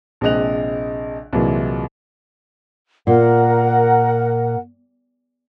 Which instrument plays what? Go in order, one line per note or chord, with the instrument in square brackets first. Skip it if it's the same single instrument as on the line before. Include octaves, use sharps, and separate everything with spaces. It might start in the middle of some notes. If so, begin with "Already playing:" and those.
[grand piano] A#1 C3 G#3 D#5 F#6 F7
C2 A#2 E3 F#3 G#3
[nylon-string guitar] A#2 [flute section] A#4 F#5